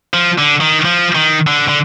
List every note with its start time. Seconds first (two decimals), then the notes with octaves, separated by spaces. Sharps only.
0.14 F3
0.38 D3
0.61 D#3
0.85 F3
1.15 D#3
1.47 D3
1.69 D3